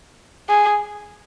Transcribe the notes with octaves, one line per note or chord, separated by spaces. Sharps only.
G#4